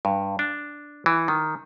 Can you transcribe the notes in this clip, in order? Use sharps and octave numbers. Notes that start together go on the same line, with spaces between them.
G2
D4
E3
D#3